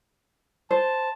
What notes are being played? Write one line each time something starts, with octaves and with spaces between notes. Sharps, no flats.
C5 A5